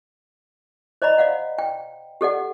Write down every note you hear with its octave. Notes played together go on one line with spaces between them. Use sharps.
C5 D5 D#5 A#5 B5
D5 F5 F#5
G5
G4 A4 D5 F#5